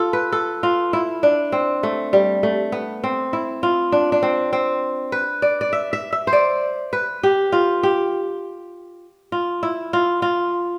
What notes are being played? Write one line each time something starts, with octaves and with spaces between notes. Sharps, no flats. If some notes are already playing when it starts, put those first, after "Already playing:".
Already playing: F4 A4
B4
A4
F4
E4
D4
C4
A3
G3
A3
B3
C4
E4
F4
D4
D4
C4
C4
B4
D5
D5
E5
E5
E5
C5
D5
B4
G4
F4
G4
F4
E4
F4
F4